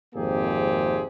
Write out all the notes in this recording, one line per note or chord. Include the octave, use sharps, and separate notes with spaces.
G#1 F2 C3 A#3 G4 G#4